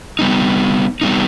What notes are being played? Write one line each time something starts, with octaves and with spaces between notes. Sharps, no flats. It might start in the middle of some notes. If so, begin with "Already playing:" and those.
G3 B3 D#4
G3 B3 D#4